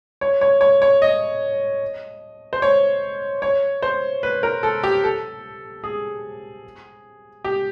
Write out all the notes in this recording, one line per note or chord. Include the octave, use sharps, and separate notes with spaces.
C#5
C#5
C#5
C#5
D#5
C5
C#5
C#5
C5
B4
A#4
A4
G4
A4
G#4
G4